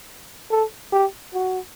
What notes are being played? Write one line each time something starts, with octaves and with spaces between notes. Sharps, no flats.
A4
G4
F#4